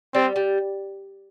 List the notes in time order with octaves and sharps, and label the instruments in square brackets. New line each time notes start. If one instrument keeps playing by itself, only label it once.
[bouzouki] G3 [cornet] C4
[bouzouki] G3